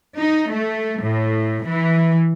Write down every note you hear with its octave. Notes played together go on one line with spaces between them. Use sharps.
D#4
A3
A2
E3